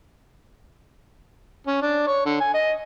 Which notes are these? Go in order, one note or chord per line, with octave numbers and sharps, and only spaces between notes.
C#4
D4
C#5
D3
G#5
D#5